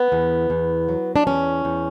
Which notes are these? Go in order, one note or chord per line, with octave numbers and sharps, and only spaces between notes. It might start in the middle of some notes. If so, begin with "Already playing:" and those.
Already playing: B3
E2
E2
F#3
D4
E2 C#4
E2